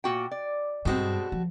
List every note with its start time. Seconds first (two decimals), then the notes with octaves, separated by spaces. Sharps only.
0.04 A#2 F#4 G5
0.31 D5
0.85 G2 B2 G3 G#3 C4 F#4 A4
1.32 F3